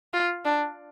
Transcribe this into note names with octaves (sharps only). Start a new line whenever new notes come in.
F4
D4